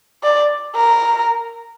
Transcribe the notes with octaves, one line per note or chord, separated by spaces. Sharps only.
D5
A#4